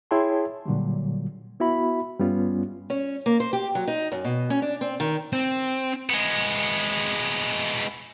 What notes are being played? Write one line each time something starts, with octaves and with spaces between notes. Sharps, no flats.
E4 G#4 C#5 G5 A5 C6
A#2 D3 F#3 G3
B3 E4 F#4 E5 B5
G2 G3 B3 C#4 F4
C#4
A#3
C5
G4
F#3
D#4
F#2
B2
C#4
D4
C4
D#3
C4
G#3 B3